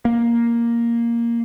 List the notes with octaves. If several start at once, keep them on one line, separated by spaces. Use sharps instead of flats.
A#3